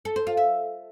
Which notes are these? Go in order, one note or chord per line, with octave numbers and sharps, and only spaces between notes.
A4
C5
F4
E5